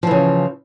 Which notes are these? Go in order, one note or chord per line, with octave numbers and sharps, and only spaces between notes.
C#3 E3 F3